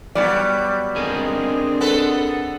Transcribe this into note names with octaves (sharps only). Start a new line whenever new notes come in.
F#3 G3 B3 D5
D3 C4 D4 G#4 A#4 D#5
B3 A4 B4